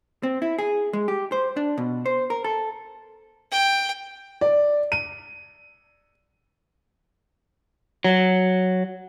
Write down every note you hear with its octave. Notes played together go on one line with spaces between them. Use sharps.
C4
E4
G#4
G#3
G4
C5
D4
B2
C5
A#4
A4
G5
D5
D#7
F#3